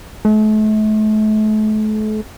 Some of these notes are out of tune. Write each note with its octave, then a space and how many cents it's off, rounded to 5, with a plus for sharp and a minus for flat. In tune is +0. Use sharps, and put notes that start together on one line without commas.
A3 -40